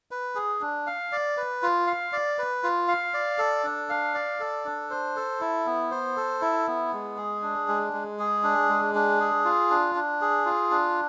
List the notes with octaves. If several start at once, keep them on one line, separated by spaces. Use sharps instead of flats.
B4
G#4
D4
F5
D5
B4
F4
F5
D5
B4
F4
F5
D5
A4
D4
F5
D5
A4
D4
C5
A4
E4
B3
C5
A4
E4
B3
G#3
G#4
D4
G#3
G#3
G#4
D4
G#3
D4
G#4
F4
D4
D4
G#4
F4
D4